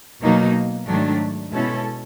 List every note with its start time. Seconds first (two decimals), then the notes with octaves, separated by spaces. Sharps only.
0.23 B2 F#3 A#3 D#4
0.88 G#2 D#3 F#3 A3 D4
1.53 B2 G#3 C#4 E4 A4